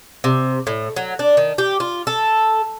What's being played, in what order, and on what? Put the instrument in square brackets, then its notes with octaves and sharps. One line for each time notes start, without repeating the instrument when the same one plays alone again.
[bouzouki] C3
A2
F#3
D4
D#3
G4
F4
A4